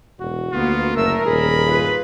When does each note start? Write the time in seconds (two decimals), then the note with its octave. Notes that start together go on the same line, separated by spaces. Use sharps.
0.20 E1 F#4
0.53 D2 A#3 B3 F4
0.96 F#1 A3 A#4 E6
1.25 D#1 G#4 B5
1.66 F4 B4